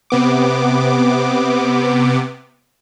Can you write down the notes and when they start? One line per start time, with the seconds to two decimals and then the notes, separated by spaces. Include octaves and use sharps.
0.10 C3 B3 D6